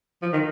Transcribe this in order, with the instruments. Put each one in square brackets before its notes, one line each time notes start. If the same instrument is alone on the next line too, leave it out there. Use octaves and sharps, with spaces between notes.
[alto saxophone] F3
D#3